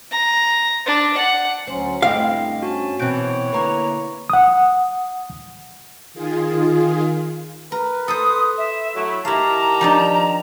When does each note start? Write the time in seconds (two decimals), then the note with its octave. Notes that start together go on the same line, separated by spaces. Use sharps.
0.11 A#5
0.86 D4
1.17 F#5
1.67 D2 F#3 C#4 C5
2.02 G2 A3 C4 E4 D#5 F5 G5
2.63 C#4 F#4 A5
2.99 B2 E3 C4 E4 C#5 G6 D7
3.53 D3 A#3 B4 A#5 C#6
4.30 F#5 D#6
6.14 D#3 F4 G#4
7.72 A#4 B4
8.08 A4 C5 D#6
8.58 E5
8.96 F#3 A3 E4
9.25 D#3 E4 G4 F5 A5 A#5
9.81 F3 D4 D#4